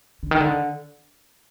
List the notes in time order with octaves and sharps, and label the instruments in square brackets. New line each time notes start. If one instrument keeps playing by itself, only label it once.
[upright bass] D3
D#3
D3